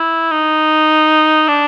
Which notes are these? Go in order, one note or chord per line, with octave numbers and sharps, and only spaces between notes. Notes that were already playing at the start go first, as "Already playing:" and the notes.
Already playing: E4
D#4
D4